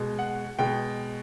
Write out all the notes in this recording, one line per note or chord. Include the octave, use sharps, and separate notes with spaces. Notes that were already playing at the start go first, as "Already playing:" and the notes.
Already playing: B2 G#3
F#5
B2 G#3 G5